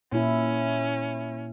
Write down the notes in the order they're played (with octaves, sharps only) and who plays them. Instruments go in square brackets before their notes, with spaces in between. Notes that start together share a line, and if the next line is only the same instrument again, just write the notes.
[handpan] A#2 E4 [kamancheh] C#4